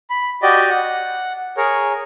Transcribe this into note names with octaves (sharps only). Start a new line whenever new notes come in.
B5
F#4 G4 D5 D#5
F#5
G#4 A#4 C#5